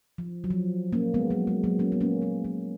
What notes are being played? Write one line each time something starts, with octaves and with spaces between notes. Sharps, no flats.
F3
F#3
F3
A#3 C#4
G#3 B3
F#3 A#3
G#3
F#3 A#3
A#3 C#4
B3
A#3 C#4
G#3 B3
F#3 A#3